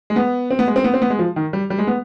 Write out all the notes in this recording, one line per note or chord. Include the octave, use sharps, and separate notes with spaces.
G#3
B3
C4
B3
G#3
C4
B3
C4
B3
G#3
F3
D#3
G3
G3
G#3
B3